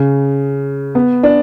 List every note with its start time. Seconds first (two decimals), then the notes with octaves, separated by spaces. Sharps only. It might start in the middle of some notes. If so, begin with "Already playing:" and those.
Already playing: C#3
0.95 B3
1.23 D4